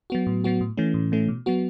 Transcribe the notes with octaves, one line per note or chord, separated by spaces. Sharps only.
F#3 B3 F#4
A2
F#3 B3 F#4
A2
E3 A3 C#4
A2
E3 A3 C#4
B2
F#3 B3 F#4